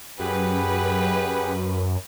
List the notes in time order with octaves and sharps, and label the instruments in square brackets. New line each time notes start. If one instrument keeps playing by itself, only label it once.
[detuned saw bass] F#2 [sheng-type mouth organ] G4 G#4 F#5 [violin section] B4